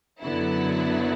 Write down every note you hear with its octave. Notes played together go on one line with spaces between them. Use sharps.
F#2 D3 F#3 B3 E4